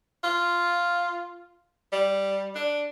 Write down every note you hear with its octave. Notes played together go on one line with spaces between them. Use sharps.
F4
G3
D4